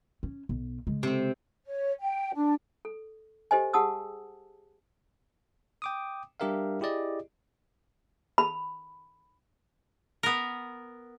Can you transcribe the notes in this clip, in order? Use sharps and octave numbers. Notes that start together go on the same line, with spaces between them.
C#4
B1
C#3 G#3
C3 C4
C#5
G5
D4
A4
G4 A4 C5 D#5 G#5
G4 G#4 F#5 A5 D#6 E6
G5 D6 D#6
G3 D4 G4 A#4 E5 F5
E4 G4 G#4 D5 D#5
B5
B3 A#4